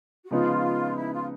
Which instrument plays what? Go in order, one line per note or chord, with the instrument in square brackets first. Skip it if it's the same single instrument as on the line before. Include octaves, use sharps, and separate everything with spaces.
[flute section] F#4
[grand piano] C#3 F3 G#3 B3 D#4 [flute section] F4
[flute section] E4
F4